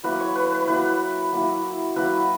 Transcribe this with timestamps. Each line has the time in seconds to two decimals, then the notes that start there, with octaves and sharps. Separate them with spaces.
0.04 F#3 A#3 E4 B4
0.20 C#5
0.35 B4
0.52 B4
0.68 F#3 A#3 E4 B4
1.32 F#3 A#3 E4
1.96 F#3 A#3 E4 B4